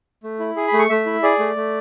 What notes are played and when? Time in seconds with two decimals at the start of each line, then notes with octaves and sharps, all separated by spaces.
0.24 A3
0.40 E4
0.57 G#4
0.68 B5
0.73 A3
0.79 C#6
0.90 A3 E5
1.06 E4
1.23 G#4 D5
1.39 A3
1.56 A3